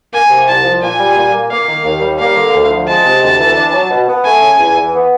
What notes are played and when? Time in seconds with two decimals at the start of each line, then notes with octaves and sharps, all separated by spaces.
0.13 A#3 G#5
0.30 C3
0.48 C2 A5
0.64 F3
0.82 A#2 G#5
0.99 G3
1.17 A#2
1.34 A#3
1.50 A#3 F5
1.68 D#3
1.84 D#2
2.01 G3
2.19 A#3 F5
2.36 D3
2.53 D2
2.70 F3
2.88 G#3 A5
3.05 C3
3.22 D2
3.40 E3
3.56 D4
3.73 F#3
3.90 B2
4.08 B3
4.25 A3 G#5
4.42 C#3
4.59 E2
4.77 E3
4.94 B3